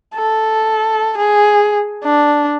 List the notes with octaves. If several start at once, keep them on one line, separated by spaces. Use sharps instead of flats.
A4
G#4
D4